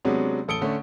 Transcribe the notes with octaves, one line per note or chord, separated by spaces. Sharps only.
C3 F#3 G#3 B3 C#4 D4
A1 A4 D#6 C#7 D7 G7
D3 A3 C#4